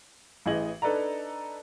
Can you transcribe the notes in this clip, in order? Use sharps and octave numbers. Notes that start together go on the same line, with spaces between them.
A1 E3 G#4 D#5 G#6 F#7
D4 D#4 A4 B4 D5 A#5